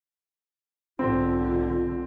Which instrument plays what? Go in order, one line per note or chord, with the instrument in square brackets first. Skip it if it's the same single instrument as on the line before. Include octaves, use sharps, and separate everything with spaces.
[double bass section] B1 G#2 D3 [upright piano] C4 [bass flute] F4